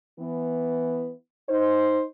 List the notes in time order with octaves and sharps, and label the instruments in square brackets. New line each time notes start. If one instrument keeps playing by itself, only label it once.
[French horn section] E3 B3
D#4 C5